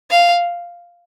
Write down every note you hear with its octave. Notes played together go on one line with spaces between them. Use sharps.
F5